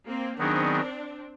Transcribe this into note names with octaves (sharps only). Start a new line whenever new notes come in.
A#3 C4
D#3 F#3 B3 C4 D4 D#4 G#4